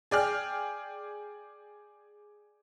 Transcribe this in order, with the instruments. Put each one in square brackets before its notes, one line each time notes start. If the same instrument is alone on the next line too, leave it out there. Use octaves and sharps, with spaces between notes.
[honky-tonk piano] G#4 D5 G5 F6